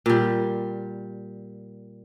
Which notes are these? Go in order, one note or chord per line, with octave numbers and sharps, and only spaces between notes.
A#2 G3